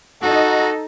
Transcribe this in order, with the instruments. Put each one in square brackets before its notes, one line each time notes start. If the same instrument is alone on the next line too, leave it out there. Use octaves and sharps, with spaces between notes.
[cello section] D#4 [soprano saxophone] F#4 [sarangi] A4